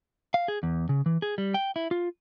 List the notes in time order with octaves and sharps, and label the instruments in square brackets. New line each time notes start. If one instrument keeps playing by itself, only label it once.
[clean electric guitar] F5
G#4
E2
C#3
E3
G#4
G3
G5
E4
F4